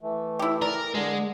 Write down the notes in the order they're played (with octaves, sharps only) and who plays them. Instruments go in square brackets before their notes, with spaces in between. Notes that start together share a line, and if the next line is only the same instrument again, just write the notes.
[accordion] E3 A3
[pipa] E4 G4
[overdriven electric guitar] A#4 [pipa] D5
[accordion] D3 [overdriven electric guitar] G#3